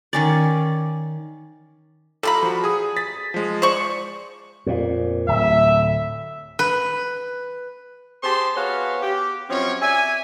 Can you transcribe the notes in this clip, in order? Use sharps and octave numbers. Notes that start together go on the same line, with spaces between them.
D#3 C#4 D5
G3 F4 A4 A#5 B5
F3 F#4
G#4 D#6
A6 B6
F3 G#3
C5 D5 C#6
F2 A#2
D1 E5
B4
G4 G#4 C5 A5 C6
B3 F#4 G#4 C#5 F5
G4
F#2 F3 C4 C#4 C#5
D5 E5 G#5